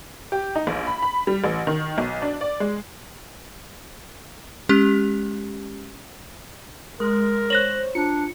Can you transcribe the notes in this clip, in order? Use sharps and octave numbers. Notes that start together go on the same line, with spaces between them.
G4
D#4
A#1
B5
B5
G3
A1
D#3
B1
D4
D5
G#3
G#3 C#4 G4
G#3 A#4
C5 C#5 F#6 A#6 F#7
D4 F4 C#7